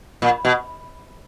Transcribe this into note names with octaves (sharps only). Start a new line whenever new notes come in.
A#2
B2